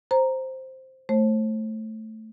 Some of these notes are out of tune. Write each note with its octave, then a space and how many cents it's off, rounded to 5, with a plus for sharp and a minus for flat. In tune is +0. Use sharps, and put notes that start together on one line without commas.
C5 +0 A#5 +0
A3 +0 C5 +35